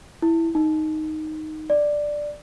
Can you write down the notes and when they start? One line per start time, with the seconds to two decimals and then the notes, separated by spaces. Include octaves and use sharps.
0.22 E4
0.55 D#4
1.70 D5